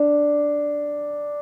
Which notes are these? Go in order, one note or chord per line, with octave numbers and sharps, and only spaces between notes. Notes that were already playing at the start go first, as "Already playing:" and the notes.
Already playing: D4